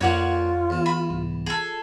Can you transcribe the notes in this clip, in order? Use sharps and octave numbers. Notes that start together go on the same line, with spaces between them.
F2 F3 A#3 D4 F4 C#5 F#5 G#5
E2 E3
B5
C2 G#2
F4 G#4 A4